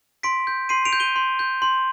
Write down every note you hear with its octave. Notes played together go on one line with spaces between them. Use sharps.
C6 B6 D7
G6
C6 C7 D#7
D7 F7
G6
D#7 G7
C6
G6
C6